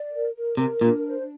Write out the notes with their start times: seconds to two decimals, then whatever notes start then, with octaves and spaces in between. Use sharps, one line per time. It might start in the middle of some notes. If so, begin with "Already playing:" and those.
Already playing: D5
0.11 A#4
0.34 A#4
0.57 C3 A#4
0.81 A#2 D4
1.04 C5